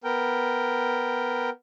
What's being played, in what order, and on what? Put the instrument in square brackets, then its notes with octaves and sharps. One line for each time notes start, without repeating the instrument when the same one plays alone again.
[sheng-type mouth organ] B3 A#4 G5